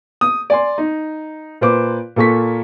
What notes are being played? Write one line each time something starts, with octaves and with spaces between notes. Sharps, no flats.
D#6
D5 G#5 C6
D#4
A#2 B4 C5 D6
A#2 A#3 A4 C#6 B6